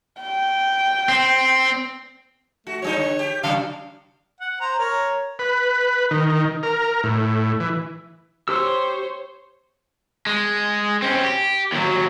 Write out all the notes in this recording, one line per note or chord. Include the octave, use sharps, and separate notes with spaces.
G5
C4
A3 F#4
G2 G3 D#4 C#5
D3
G4
C3 F#3 D4 F5
F#5
C5 A#5
A#4 C#5
B4
D#3
A#4
A2
E3
G4 C5 C#5 E6
G#3
C4 C#4
G4
D#2 F#3